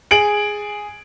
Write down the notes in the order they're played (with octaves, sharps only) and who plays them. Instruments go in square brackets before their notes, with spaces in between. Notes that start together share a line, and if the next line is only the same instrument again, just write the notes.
[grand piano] G#4 D7 F#7